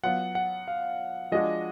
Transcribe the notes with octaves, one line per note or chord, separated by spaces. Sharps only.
F#3 B3 F4 F#5
F#5
F5
F3 G#3 D4 F#4 D#5